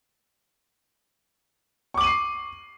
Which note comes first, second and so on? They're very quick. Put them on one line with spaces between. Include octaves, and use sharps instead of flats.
C#6 D6 F#7 D#7 C7